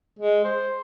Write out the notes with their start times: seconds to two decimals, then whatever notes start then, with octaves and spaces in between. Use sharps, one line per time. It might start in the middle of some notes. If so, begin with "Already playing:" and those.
0.19 G#3
0.44 C5